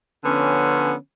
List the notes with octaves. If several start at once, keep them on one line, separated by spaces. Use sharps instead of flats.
D3 F3 B3 C#4